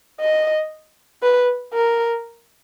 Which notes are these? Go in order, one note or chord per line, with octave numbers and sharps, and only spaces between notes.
D#5
B4
A#4